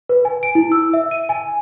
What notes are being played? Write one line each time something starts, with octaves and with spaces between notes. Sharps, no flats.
B4
G#5
D7
E4
E6
E5
D#7
G#5